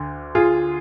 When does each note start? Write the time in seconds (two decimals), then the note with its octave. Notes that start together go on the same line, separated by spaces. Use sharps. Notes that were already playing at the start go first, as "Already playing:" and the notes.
Already playing: D2 D3
0.35 F4 G#4